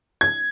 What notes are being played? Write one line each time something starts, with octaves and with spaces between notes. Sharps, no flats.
G#6